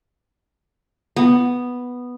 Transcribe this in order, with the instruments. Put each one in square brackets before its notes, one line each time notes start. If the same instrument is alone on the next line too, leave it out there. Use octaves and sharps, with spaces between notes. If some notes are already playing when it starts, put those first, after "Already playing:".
[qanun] B3